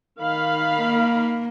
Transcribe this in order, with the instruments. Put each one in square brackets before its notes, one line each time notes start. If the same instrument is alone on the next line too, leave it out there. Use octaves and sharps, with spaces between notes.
[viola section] D#3 F5 B5
[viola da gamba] A#3